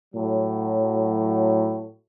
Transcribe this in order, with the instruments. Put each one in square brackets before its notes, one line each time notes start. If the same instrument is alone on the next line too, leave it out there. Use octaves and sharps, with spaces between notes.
[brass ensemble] A2 F#3